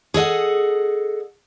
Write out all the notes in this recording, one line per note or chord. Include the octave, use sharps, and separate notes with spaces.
G#4 A4 D#5 F#5